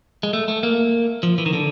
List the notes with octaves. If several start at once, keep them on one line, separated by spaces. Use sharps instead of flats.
G#3
A3
A3
A#3
F3
E3
D#3
D3